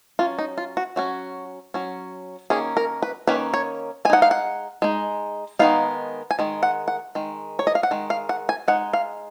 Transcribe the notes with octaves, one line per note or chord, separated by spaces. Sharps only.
F#3 C#4 F4
D#4
F4
F#4
F#3 C#4 F#4
F#3 C#4
D#3 A#3 C#4 G#4
A#4
B4
D#3 A#3 C#4 B4
C#5
G#3 D#4 F#5 G#5
F5
F#5
G#3 D#4
D#3 G#3 B3 D#4 F5
G#5
D#3 G#3
F#5
F#5
D#3 G#3
C#5
D#5
F5
F#5
D#3 G#3
F5
F#5
G#5
G#3 D#4 F#5
F5